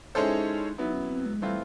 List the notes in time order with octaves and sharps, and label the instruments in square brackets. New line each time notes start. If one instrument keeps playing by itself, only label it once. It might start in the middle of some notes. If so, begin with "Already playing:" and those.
[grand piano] G#3 C#4 E4 A4 C5 [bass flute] D#4
[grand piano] F#3 B3 E4 [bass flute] D#4
[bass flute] C#4
C4
G#3
[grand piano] E3 A3 C4 F4 [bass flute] G3